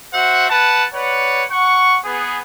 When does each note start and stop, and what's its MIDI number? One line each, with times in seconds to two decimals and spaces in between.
0.14 0.46 66
0.14 0.46 72
0.14 0.46 76
0.14 0.46 78
0.50 0.85 71
0.50 0.85 78
0.50 0.85 81
0.94 1.44 71
0.94 1.44 73
0.94 1.44 74
0.94 1.44 78
1.50 1.98 78
1.50 1.98 85
2.05 2.41 59
2.05 2.41 68